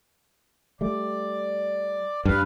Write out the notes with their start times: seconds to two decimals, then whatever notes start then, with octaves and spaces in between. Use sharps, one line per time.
0.81 G3 A3 D5
2.25 G2 B4 F5